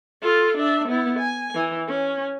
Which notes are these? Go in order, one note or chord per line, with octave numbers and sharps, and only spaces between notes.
F4 A4
D4 E5
B3 E4
G#5
E3
C#4